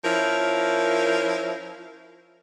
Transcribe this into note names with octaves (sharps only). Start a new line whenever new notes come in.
F3 C#4 E4 A#4